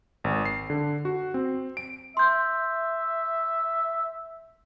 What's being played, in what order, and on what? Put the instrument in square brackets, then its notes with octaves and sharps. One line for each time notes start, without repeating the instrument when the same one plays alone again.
[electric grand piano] G#1
C7
D3
F#4
C4
D7
[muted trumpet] E5 [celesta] C6 G6